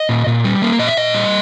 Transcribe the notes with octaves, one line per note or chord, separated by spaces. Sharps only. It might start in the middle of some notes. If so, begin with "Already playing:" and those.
Already playing: D#5
A#2
A#2
G3
A#3
A#2 D#5
E5
A#2 D#5
G3